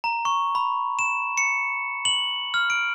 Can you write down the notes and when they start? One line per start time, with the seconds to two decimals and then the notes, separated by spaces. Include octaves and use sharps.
0.04 A#5
0.25 C#6
0.55 B5
0.99 E7
1.37 C#7
2.05 F#7
2.54 F6
2.70 D7